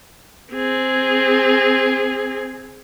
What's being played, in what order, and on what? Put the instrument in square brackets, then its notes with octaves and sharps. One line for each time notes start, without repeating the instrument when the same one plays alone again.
[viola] C4 G#4